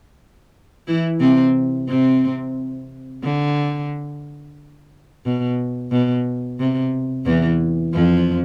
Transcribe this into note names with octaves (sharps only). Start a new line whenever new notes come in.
E3 E4
C3 C4
C3 C4
D3
B2
B2
C3
E2 E3
F2 F3